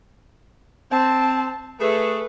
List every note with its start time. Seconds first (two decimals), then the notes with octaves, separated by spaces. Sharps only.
0.91 C4 A5
1.80 A3 G#4 B4